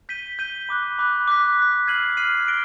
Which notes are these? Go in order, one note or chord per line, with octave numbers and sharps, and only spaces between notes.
G6 B6 D#7 G7
G6 B6 D#7 G7
B5 D6 F#6
B5 D6 F#6
D6 F#6 B6
D6 F#6 B6
F6 G#6 C7 D#7 F#7
F6 G#6 C7 D#7 F#7
F#6 A#6 D7 G7